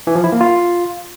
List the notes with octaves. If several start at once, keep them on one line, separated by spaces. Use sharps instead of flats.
E3
F3
E4
A#3
F4